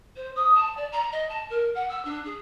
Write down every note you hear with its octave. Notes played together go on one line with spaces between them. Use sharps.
C5
D#6
A5
D5
A#5
D#5
A5
A#4
F#5
E6
D4
G#4